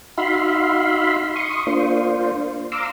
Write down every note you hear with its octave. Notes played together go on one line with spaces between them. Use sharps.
D#4 F#4 E5 F5 B5 C6
C6 C#6 D#6
A#3 D4 F4 C5
F5 A#5 C6 D6 E6